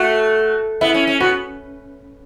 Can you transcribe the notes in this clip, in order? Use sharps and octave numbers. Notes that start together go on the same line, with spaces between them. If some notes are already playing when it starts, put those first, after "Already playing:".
Already playing: A3 F#4
B3 E4
C#4
C#4
B3 F#4